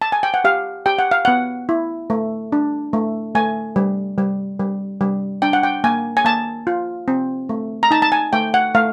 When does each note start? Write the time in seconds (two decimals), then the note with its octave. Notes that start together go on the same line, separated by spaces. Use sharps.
0.02 A5
0.12 G#5
0.23 G5
0.34 F#5
0.44 G4 F5
0.86 G4 G5
0.99 F#5
1.11 F5
1.25 B3 F#5
1.69 E4
2.10 A3
2.52 D4
2.93 A3
3.35 A3 G#5
3.76 G3
4.18 G3
4.60 G3
5.01 G3
5.42 D4 G5
5.53 F#5
5.63 G5
5.84 A#3 G#5
6.17 G#5
6.25 A#3 A5
6.67 F4
7.08 C4
7.49 A3
7.83 A#5
7.91 D#4 A5
8.02 A5
8.12 G#5
8.33 A3 G5
8.54 F#5
8.74 A3 F5